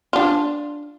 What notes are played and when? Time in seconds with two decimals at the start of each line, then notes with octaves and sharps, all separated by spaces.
0.13 D4 F4